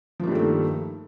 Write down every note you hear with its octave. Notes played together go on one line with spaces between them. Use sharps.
G2 D#3 F3 A3 A#3